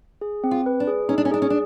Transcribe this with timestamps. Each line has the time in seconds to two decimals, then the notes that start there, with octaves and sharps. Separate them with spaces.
0.21 G#4
0.44 C4
0.51 F4
0.66 B4
0.80 D4
0.87 G#4
1.09 C#4 D#4
1.18 D4
1.25 C#4
1.31 D4 G#4
1.42 C#4
1.50 D4